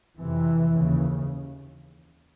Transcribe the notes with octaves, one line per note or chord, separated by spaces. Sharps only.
F2 C3 E3
D#2 C#3